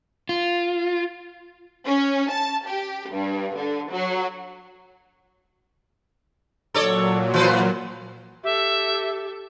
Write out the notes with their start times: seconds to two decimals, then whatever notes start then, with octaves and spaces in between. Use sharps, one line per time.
0.29 F4
1.85 C#4
2.31 A5
2.67 G4
3.10 G2
3.56 D3
3.90 F#3
6.74 A#2 F#3 A4 C#5 D5
7.34 E3 B4 C5
8.44 G4 A4 E5